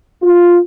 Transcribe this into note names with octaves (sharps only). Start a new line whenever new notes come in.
F4